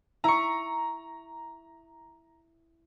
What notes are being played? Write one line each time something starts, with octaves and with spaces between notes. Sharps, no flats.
E4 A#5 C#6